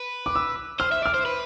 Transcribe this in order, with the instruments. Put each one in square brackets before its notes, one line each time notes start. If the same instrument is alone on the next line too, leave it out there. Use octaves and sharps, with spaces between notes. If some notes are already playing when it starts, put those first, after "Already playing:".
Already playing: [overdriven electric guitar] B4
[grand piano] D6
E6
[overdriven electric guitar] C5 [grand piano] F6
[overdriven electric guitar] E5
D5
[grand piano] F6
[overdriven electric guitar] C5
B4